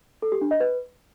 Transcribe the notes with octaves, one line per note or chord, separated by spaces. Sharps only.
A4
G4
D4
D#5
B4